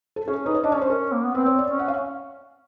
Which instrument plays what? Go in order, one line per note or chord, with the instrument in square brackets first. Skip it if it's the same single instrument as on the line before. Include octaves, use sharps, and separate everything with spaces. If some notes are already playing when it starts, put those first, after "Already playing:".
[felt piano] A4
[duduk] C#4 [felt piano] G#4
[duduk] D#4 [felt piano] B4
[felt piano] C#5
[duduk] D4 [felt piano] D#5
[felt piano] C#5
[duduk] C#4
[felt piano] C5
[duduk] C#4 [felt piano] A#4
[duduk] A#3
B3
[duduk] C4 [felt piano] B4
[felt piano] C#5
D5
[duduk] C#4
[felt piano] F#5
F5